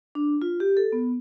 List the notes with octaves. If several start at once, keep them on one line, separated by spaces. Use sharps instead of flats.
D4
F4
G4
A4
B3